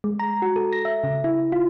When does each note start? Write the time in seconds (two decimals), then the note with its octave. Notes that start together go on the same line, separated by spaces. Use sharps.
0.04 G#3
0.19 A#5
0.42 F#4
0.56 A4
0.73 A#6
0.85 E5
1.04 C#3
1.24 E4
1.52 F4